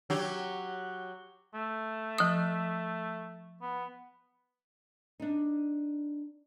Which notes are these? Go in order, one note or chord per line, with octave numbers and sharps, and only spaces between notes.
F#3 G4
A3
F3 D#6
B3
D4 D#4